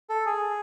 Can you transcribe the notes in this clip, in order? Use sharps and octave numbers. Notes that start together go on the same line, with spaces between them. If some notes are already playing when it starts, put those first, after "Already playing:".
A4
G#4